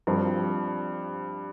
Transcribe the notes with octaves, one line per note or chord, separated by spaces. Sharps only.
G2 F3 C4